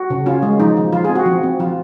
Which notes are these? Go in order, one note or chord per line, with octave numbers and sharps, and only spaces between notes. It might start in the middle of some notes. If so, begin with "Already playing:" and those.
Already playing: F#4
C#3
C#4 F4
G#3
F3 D#4
F3
F3 F4
C4 G#4
F#4
F3
C4
F3 F4